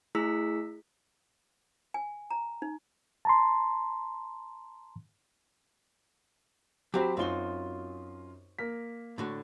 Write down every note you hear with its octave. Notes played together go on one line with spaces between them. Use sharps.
A3 E4 G#4 E6 B6
G#5
A#5
D#4
A5 A#5 C6
F#3 C4 G4 C5 G5 B5
F#2 C4 D#4 F4 F#4 G7
A#3 A#4 B6
A2 D3 F#4